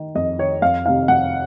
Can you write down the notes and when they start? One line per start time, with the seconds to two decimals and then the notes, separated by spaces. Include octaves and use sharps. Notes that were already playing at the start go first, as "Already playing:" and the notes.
Already playing: D#3
0.15 F2 D#5
0.39 D#3 C#5
0.62 F2 F5
0.86 C3 D#3 F5
1.08 F2 F#5